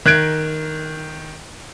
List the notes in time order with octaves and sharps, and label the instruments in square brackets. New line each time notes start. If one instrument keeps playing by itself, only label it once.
[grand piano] D#3 F#6 G#6 D7